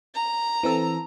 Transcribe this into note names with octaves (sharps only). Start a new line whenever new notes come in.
A#5
E3 C4 A4